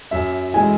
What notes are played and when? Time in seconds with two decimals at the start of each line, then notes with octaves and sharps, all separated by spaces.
0.11 F#2 E5
0.53 E3 G#3 G#5